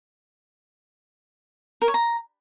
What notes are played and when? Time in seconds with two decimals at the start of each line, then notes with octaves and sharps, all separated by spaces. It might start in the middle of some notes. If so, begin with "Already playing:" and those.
1.82 A#4
1.88 C#5
1.94 A#5